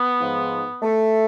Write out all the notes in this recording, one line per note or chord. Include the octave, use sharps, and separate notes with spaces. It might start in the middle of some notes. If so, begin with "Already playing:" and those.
Already playing: B3
G#2 F3
A3